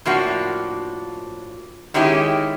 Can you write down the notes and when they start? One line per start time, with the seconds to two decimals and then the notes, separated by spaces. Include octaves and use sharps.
0.05 A2 F3 A#3 D4 F#4
1.94 D#3 G#3 C#4 E4 G4